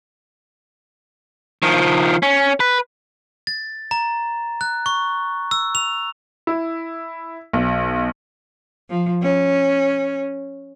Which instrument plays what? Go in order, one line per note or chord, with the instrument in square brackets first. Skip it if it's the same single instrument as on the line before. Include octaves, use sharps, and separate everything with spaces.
[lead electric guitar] D#3 F3
C#4
B4
[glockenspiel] A6
A#5
F#6
C#6
E6
F7
[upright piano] E4
B1
[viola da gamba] F3
C#4